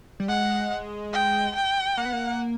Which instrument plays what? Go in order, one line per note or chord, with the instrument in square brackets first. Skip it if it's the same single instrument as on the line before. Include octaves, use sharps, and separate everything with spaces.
[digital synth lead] G3
[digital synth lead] G#3 [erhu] F#5
[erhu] G5
G5
[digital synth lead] A#3 [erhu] F#5
[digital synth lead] B3
A#3